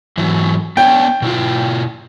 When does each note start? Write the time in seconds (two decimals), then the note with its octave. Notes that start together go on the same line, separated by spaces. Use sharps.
0.18 G#2 E3 F#3
0.77 B3 D4 C#5 G5
1.22 B2 E4 F4